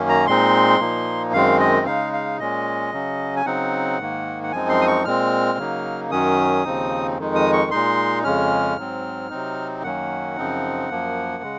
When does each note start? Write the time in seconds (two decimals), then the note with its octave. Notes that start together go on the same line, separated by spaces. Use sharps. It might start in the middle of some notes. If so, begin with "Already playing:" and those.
Already playing: F#2 D#3 A#3 C#4
0.09 A#5
0.27 A#2 G#3 C4 D#4 C6
0.80 A#2 F3 A#3 D#4
1.33 F#2 D#3 G#3 C4 F5
1.60 D#5
1.86 C#3 G#3 D#4 F5
2.13 F5
2.39 A#2 G#3 C#4 D#5
2.93 C#3 F#3 C#4
3.36 G#5
3.46 C#3 F#3 C4 D#4 F#5
3.99 G#2 D#3 A#3
4.43 F#5
4.52 F#2 F3 G#3 C4 D#4 G#5
4.69 C6
4.81 D#6
4.87 C#6
5.05 A#2 G#3 C4 F6
5.58 C#3 F#3 A#3 D#4
6.11 F#2 D#3 F#3 C#4 D#6
6.65 D#2 C#3 F3 C4 D#4
7.17 F2 D#3 G#3 D#4
7.35 D#6
7.53 C#6
7.71 A#2 G#3 D#4 C6
8.24 F2 C#3 G#3 C#4 F6
8.77 G#2 F#3 C4
9.30 C3 F#3 C4 D#4
9.83 F#2 D#3 F#3 A#3 C#4 F#5
10.36 F#2 C#3 F3 C4 D#4
10.90 F#2 F3 A#3
11.43 C#3 G#3